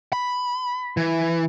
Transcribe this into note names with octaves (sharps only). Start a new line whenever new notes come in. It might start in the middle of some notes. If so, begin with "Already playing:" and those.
B5
E3